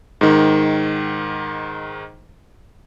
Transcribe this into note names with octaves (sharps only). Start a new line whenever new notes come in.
G#2 D#3